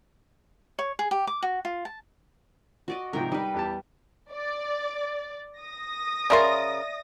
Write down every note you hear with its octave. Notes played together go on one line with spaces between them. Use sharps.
C#5
G#4
G4
D6
F#4
F4
A5
F#4 D5 D#5
G#2 C3 F3 A#4 G5
G3 D#4 B4
E2 G4 A5
D5
D#6 A#6
C#3 A#4 D5 E5 C6 A6